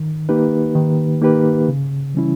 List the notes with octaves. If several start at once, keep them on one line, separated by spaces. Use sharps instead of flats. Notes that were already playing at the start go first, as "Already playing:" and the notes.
Already playing: D#3
A#3 D#4 G4 B4
D#3
A#3 D#4 G4 B4
C#3
E3 G3 C#4 E4